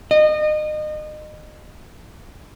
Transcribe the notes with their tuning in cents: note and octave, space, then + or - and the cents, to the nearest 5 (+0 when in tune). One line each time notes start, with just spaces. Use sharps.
D#5 -30